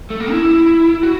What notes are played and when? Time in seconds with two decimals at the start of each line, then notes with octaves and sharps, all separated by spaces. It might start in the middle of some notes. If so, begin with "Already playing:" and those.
0.10 A3
0.20 A#3
0.31 E4
1.03 F#4